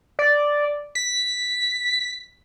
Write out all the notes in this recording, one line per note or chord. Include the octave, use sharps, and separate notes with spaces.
D5
B6